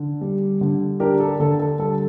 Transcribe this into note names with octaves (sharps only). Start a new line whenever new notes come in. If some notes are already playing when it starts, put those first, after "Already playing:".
Already playing: D3 D4
G3
D3
D4 G4 A#4
A4
D3 A4
A4
G3 A4